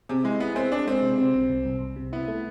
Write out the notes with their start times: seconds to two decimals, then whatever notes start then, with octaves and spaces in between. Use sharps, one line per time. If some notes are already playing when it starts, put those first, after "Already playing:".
0.09 C3 G#4
0.24 G#3 E4
0.40 B3 E4
0.55 C4 G#4
0.72 D4 G#4
0.87 G#3 C4
1.02 C3
1.18 C3
1.34 C2
1.49 C2
1.66 C2
1.81 C2
1.96 C3
2.13 B3 E4
2.28 A3